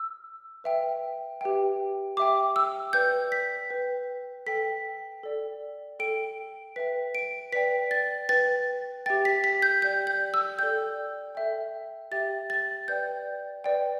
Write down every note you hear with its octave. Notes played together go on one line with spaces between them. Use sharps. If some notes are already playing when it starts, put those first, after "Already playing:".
Already playing: E6
B4 E5 G5
G4 B4 E5 G5
G4 E5 G5 D6
E6
B4 D5 G5 G6
B6
B4 G5
A4 G5 B6
A4 D5 G5
A4 G5 D7
B4 E5 G5 B6
D7
B4 D5 G5 B6
A6
B4 G5 A6
G4 E5 G5 A6
B6
B6
G6
G4 D5 G5 G6
G6
E6
A4 D5 G5 G6
A4 E5 G5
G4 E5 G5 A6
A6
B4 D5 G5 G6
B4 D5 G5